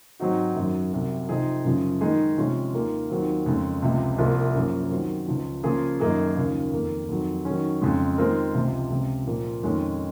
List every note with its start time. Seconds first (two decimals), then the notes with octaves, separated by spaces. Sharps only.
0.19 G#2 F#3 C4 D#4 F#4
0.56 F#2 D#3 F#3
0.92 C2 C3 F#3
1.29 C3 F3 C4 D#4 G#4
1.65 F#2 C#3 F3
2.01 D#3 G#3 D#4 G#4
2.37 C3 F3 G#3 C#4 F4
2.73 D#2 D#3 A#3 F4
3.10 D#2 D#3 F#3 C4 F4
3.46 F2 C#3 G#3
3.82 C#2 C3 F3 G#3
4.19 C2 C3 F3 A#3
4.55 F#2 F3 A#3 C#4
4.91 D#3 F#3 C4
5.27 C#2 C#3 F3
5.64 C#3 F3 A#3 F4 G#4
6.00 F#2 D#3 A#3 D#4 G#4
6.36 D#2 C#3 F3
6.72 F2 D#3 A#3
7.09 F2 D#3 F#3
7.45 D#3 F#3 C#4
7.82 F2 C#3 G#3
8.18 D#3 G#3 C4 F4 A#4
8.54 C#2 C3 F3 G#3
8.90 C#2 C3 F3 G#3
9.27 A#2 F3 A#3
9.63 F2 D#3 G#3 C#4